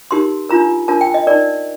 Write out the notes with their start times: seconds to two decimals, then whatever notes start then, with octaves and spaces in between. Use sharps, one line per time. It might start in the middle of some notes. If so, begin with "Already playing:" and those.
0.11 D#4 G4 A#4 C6
0.49 D4 F4 A#4 A#5
0.88 D4 F4 A#4 A5
1.01 G5
1.14 D#5
1.27 D#4 A#4 D5